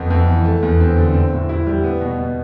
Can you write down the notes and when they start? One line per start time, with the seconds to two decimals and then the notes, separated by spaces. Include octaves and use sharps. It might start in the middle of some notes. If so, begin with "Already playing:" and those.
Already playing: F2 B3
0.10 F2
0.28 E3
0.45 A3
0.62 E2
0.80 C4
0.96 D3
1.14 C4
1.32 A2
1.49 E4
1.67 G3
1.84 B3
2.01 B2
2.19 B2